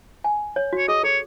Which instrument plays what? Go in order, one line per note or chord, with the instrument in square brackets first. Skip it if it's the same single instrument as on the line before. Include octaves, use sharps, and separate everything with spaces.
[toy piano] G#5
C#5
F#4
[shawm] C#5
[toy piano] G#4 [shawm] D#5
[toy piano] A4 [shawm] C#5